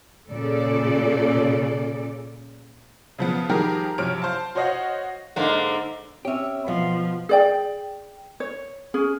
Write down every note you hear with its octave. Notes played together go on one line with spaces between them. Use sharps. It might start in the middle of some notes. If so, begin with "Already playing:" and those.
A#2 C#3 A4 D5
C#3 F3 B3
D#3 F3 G3 G4 G#4 A#4
F#2 C3 F3 C#5 F6 D7
C5 F5 A5
F#4 C5 C#5 D#5 F5 F#5
G#2 D3 A#3
C4 C#4 G4 C#5 E5
B2 F3 B3 F5
G#4 D5 G5
C#5
C#4 G#4